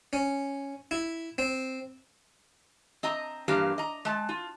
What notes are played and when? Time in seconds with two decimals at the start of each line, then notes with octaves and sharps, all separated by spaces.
0.13 C#4
0.91 E4
1.38 C4
3.03 C4 D#5 A#5
3.48 G2 E3 A#3 G4 F5
3.78 D#5 A#5
4.05 G#3 A5
4.29 F4